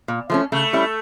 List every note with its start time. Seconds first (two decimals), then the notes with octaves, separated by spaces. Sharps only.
0.08 A#2
0.30 F3 A3 C#4
0.52 C#3 A3
0.73 G3 C#4 E4